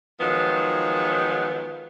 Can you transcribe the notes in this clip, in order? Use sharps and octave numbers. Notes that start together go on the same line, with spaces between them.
D#3 F3 F#3 G#3 B3